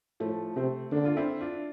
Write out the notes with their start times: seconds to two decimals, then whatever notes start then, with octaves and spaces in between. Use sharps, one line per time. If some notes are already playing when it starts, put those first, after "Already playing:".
0.20 A2 F3 A3
0.56 C3 A3 C4
0.92 D3 A#3 D4
1.05 F4
1.17 C4 E4
1.41 D4 F4